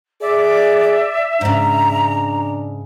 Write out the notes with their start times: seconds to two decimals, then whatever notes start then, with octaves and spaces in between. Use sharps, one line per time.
0.21 G#4 D5 E5
1.41 G#2 C#3 D4 A#5